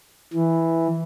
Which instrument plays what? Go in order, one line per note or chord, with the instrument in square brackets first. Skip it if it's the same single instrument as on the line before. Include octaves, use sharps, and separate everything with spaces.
[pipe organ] E3